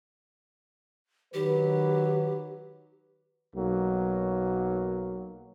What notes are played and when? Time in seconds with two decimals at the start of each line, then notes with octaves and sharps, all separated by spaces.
1.34 D#3 F#3 G4 B4
3.54 B1 F#3 A#3